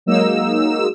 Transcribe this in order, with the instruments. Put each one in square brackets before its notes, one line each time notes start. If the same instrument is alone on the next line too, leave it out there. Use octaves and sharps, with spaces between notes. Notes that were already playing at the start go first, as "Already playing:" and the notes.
[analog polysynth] F#3 G#3 A#3 D#4 E6